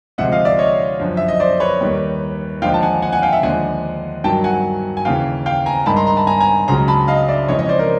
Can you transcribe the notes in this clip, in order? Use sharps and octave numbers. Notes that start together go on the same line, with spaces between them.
D2 C3 F3 G#3 E5 F#5
D#5 F5
D5 E5
C#5 D#5
F#2 D3 F3
E5
D#5
C5 D5
B4 C#5
D#2 D#3 G3
D#2 D3 F3 G#3 F5 G5
A5
F#5 G#5
F#5 G#5
F#5 G#5
F5 G5
E5 F#5
D#2 D3 F3 G#3 F#5 G#5
G2 D#3 F#3 G5 A5
F#5 G#5
G#5
D#2 C#3 E3 F5 G5
F5 G5
G#5 A#5
G2 D#3 G#3 A5 B5
A#5 C6
A#5 C6
A5 B5
G#5 A#5
G#5 A#5
C#2 C#3 F#3 A#5 C6
A5 B5
D#5 F5
D5 E5
F2 C#3 E3 G#3 C#5 D#5
C#5 D#5
C5 D5
A#4 C5